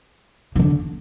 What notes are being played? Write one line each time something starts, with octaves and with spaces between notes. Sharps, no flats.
E3
D3